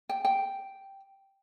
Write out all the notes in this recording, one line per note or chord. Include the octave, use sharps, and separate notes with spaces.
G5
G5